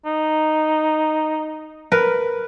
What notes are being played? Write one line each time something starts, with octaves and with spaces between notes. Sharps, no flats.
D#4
A#4 B4